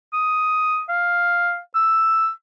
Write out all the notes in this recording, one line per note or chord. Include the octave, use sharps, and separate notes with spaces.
D#6
F5
E6